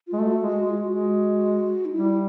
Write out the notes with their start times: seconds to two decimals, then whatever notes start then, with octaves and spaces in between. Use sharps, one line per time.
0.07 F4
0.13 G#3
0.19 A3 F#4
0.41 G#3
0.48 F#4
0.63 G#3
0.70 F4
0.78 F#4
0.84 G#3
1.85 D#4
1.93 G3 E4